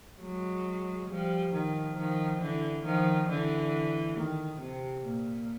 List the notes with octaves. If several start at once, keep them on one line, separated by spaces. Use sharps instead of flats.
F#3 G#3
F3 G3
D#3 F3
D#3 F3
D3 E3
D#3 F3
D3 E3
D#3
C3
A#2